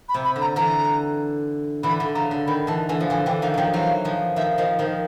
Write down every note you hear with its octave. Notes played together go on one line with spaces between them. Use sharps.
B5
C3
B5
D3
A#5
D3 E3 A#5
D3 E3 B5
D3
C#3 A#5
D3
D#3 B5
D3 E3 A5
D3 E3 G#5
F3
D3 E3 G#5
D3 E3 G5
D#3 F3 F5
D#3 F3 F#3 G5
E3 F#3 F5
D#3 F3
D#3 F3 E5
D#3 F3 D#5
D#3 F3 A#4